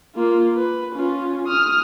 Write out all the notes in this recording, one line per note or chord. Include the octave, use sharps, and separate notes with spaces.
A#3 F4
B4
C#4 F4
D#6 F6